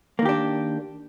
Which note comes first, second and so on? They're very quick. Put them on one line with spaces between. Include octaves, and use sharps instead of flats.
A#3 D#3 G4 D4